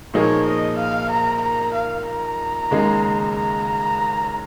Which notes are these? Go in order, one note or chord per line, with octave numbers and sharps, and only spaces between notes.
A#2 F3 A#3 D#4 G#4 C#5
D#5
F5
A#5
A#5
F5
A#5
D#2 C#3 G#3 D#4 G#4
A#5